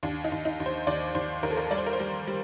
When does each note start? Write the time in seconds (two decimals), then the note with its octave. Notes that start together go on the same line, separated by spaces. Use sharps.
0.03 D#2 D4
0.24 D#4
0.32 D#2
0.45 D#4
0.60 D#2
0.66 C5
0.87 D#2 D5
1.15 D#2 C5
1.43 D#2 A#4
1.51 A4
1.57 A#4
1.71 G3 D5
1.78 C5
1.86 A#4
1.93 C5
1.99 G3
2.27 G3